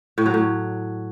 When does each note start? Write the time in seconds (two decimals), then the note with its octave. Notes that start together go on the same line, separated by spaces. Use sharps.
0.18 A2
0.26 F#3
0.34 A2